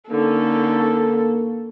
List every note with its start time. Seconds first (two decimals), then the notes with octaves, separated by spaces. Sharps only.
0.11 D3 A#3 C#4 D#4 A4